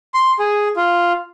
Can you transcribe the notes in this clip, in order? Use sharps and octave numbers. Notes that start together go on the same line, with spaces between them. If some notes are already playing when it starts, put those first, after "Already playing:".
C6
G#4
F4